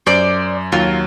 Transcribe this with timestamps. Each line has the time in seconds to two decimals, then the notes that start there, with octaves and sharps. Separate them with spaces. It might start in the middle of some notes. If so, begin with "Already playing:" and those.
0.07 F#2 C5 D5
0.72 D#2 F#3 F4